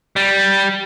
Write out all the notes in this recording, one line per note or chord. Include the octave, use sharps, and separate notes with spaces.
G3